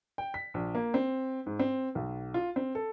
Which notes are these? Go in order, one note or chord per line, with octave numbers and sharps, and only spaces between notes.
G5
B6
A#1
A#3
C4
G#2
C4
B1
F4
C4
A4